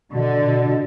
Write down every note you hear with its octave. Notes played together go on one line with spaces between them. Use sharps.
B2 D3
B2
B2